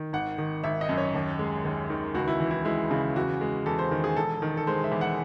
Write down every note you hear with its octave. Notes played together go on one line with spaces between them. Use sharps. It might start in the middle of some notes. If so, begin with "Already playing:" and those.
Already playing: D#3
G#1 F#5
D#3
G#1 E5
D#5
F#2
C#5
D#2
G#3
D#2
D#3
C#2 F#4
E4
E3
E4
G#3 E4
C#3
E2 F#4
G#3
E2 A4
C5
D#3
G#4
E1 A4
D#3
A4
G#3 C5
E5
E2
F#5